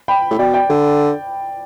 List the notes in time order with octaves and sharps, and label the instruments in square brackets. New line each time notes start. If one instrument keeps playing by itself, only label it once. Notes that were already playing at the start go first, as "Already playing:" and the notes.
[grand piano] G5 B5
[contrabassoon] A2
[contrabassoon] B2 [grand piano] D5 G5
[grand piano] D5 G5
[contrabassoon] D3